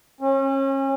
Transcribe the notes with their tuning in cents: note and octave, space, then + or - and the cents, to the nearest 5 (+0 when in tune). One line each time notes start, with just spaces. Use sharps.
C#4 -35